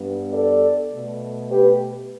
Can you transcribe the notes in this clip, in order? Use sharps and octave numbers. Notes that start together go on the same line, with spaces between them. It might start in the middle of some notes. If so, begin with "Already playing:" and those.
Already playing: G2 G3 B3
A4 D5
B2 A3
G4 B4